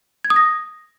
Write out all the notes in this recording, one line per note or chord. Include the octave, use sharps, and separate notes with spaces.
G#6
D#6
A#6